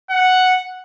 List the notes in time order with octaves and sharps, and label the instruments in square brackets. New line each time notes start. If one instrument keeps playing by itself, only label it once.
[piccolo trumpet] F#5